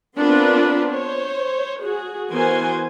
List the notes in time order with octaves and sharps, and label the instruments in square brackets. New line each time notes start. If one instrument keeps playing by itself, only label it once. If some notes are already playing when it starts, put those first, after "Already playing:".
[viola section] B3 C4 D4 F4 A#4 B4
C5 C#5
F#4 G#4
E3 B3 F#4 A#4 C5 G#5